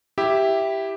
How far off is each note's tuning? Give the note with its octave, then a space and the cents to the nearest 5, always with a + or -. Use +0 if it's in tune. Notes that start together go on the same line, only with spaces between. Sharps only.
E4 +0 G4 +0 E5 +0